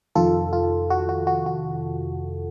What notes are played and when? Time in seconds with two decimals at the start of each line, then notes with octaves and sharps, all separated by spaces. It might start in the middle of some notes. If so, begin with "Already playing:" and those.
0.15 F2 C3 D#3 F4 A4
0.53 F4
0.90 F#4
1.09 F#4
1.27 F#4
1.46 F#4